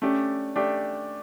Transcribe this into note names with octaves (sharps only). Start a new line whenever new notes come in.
A3 C#4 D4 G4 D5
A3 D4 G4 D5